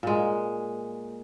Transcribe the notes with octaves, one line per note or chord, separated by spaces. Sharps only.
A#2 G#3